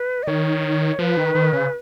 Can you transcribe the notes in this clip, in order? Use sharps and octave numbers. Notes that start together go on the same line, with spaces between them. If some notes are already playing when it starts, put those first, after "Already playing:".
Already playing: B4
D#5
D#3 C#5
F3 B4
D#3
D#3
C#3